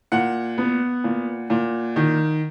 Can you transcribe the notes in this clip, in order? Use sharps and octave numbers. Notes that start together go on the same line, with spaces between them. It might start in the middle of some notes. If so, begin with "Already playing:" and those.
A#2 F#5
B3
A#2
A#2
D#3